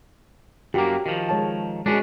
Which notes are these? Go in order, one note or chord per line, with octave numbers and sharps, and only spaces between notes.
F#2 A#3 F#4 G4
D#3 F3
G#3 C#5 A5
B2 G#3 C#4 D4 F#4